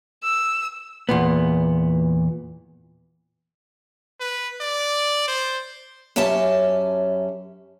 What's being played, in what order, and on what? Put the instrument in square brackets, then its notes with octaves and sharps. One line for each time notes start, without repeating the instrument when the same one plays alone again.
[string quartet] E6
[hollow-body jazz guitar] E2 A#2 B3
[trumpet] B4
D5
C5
[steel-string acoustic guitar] F#2 C#4 G4 E5 A5